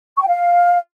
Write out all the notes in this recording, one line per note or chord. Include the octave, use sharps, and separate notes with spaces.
C#6
G5
F5